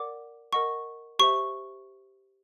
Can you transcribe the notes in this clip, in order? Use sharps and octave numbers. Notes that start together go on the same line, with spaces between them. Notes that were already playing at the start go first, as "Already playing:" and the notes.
Already playing: A#4 D5 F#5 D6
A#4 D#5 F#5 C#6
G4 C5 E5 C#6